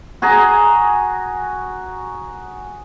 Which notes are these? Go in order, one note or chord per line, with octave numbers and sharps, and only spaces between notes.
F#4 G#4 G#5 A#5